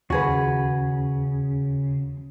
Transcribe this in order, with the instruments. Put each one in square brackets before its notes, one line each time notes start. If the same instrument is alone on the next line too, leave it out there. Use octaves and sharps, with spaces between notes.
[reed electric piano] D#2 [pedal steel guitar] C#3 [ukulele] F#4 G#4 B4